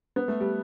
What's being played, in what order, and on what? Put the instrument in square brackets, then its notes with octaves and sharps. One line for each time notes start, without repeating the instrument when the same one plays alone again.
[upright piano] B3
A3
G3